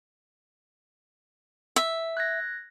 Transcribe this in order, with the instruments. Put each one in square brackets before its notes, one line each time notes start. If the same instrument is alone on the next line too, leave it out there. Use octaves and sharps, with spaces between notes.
[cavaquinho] E5
[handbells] F#6 G#6 A#6